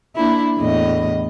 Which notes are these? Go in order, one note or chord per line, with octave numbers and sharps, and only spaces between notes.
A#3 D4 E4
E2 A2 D#5